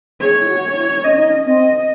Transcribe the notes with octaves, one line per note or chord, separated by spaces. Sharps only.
G#4 C#5
E4
F#4
E4
C#4 D#5
D#4
C#4
C4 D#5